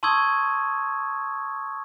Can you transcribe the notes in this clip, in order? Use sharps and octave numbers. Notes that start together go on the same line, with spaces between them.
A5 C6 C#6 D#6 E6 G#6